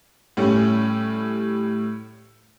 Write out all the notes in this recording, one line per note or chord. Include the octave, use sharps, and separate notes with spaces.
A2 G3 C#4